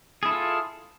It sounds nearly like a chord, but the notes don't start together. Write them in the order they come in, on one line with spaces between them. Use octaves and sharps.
G#4 E4 A4 F4